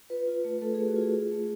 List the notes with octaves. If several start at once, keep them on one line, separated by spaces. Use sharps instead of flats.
F4 B4
F4
A3
B4
A3 A4
G#4
A3
F#4
F4 G#4
F4
A3